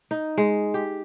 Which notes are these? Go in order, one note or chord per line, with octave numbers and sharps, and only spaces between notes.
D#4
G#3
G4